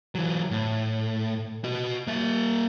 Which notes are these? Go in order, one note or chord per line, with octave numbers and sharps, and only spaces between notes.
E3 F#3
A2
F#4 D#5
A#3 E5